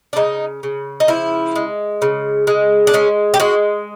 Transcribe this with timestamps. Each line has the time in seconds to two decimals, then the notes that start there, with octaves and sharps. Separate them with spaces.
0.13 D4
0.16 C#3 D#4
0.63 C#3
1.00 D#4
1.08 F3 E4
1.56 G#3
2.02 C#3
2.47 G#3
2.87 D4
2.94 G#3 C#4
3.34 G4
3.40 G#3 F#4